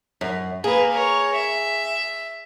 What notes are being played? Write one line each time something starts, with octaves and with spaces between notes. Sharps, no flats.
F#2
A#3 G#4 B4
A#4 C#5
E5